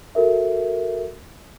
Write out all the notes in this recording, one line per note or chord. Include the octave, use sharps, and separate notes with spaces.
F#4 A4 A#4 E5